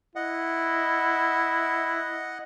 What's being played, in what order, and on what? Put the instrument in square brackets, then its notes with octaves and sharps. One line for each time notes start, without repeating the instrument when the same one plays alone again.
[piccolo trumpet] E4 [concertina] D#5 F#5